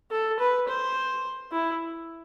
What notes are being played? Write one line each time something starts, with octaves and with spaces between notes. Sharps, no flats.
A4
B4
C5
E4